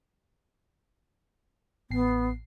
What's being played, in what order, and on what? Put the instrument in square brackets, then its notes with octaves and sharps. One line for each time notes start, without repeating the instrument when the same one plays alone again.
[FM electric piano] A1 C7 [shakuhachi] B3